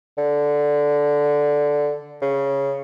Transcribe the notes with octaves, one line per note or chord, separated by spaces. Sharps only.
D3
C#3